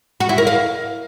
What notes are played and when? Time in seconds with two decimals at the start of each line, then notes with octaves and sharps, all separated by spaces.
0.20 F#4
0.29 E4
0.38 A#4
0.47 F5